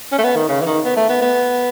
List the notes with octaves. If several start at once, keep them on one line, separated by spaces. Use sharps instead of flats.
C#4
A3
B3
D#3
C#3
E3
D#3
B3
A3
B3
B3